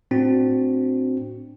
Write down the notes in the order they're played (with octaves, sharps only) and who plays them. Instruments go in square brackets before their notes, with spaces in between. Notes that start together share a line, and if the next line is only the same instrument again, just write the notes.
[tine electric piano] A2 C4 D4 F#4